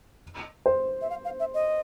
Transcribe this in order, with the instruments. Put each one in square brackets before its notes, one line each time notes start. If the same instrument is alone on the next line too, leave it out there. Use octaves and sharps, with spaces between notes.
[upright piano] C5
[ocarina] E5
F5
F5
E5
D#5